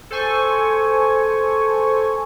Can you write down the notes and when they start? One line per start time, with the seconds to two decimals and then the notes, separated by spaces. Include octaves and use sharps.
0.10 A4 C5 G#5 C#6